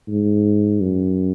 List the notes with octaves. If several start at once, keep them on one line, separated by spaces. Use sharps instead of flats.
G#2
F#2